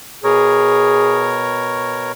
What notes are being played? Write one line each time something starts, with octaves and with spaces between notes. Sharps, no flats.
B2 G#4 A#4 C#5